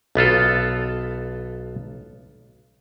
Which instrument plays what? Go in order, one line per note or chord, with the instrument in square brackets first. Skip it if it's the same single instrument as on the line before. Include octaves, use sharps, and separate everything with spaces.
[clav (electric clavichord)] B1 B3 F4 A4